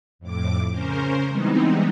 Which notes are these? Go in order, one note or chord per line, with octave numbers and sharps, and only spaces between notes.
F2 A2 D6
C#3 C#4 A#4 C5
E3 G3 G#3 B3 C4 D#4